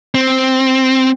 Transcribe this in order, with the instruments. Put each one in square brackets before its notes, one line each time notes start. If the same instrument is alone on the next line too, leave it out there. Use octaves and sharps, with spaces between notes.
[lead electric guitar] C4